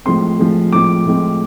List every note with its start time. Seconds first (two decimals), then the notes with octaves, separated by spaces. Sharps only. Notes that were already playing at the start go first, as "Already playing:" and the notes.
0.05 A2 F3 G#3 C4 C6
0.39 A2 F3 G#3 C4
0.72 A2 F3 G#3 C4 D6
1.05 A2 F3 G#3 C4